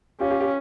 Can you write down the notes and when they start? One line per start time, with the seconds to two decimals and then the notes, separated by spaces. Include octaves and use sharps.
0.20 C#4 F4 G4
0.30 F4 G4
0.40 F4 G4